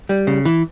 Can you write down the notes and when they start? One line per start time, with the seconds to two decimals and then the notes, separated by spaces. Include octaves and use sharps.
0.09 G3
0.27 C#3
0.45 E3